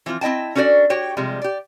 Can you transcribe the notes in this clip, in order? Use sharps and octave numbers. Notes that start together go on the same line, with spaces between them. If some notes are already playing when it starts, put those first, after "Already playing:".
E3 F3 C4 F4
C4 E4 D#5 G5 A5
C#4 D4 F#4 A4 C5 D5
F#4 G4 C#5 G5
C3 F3 G3 G#3
G4 D5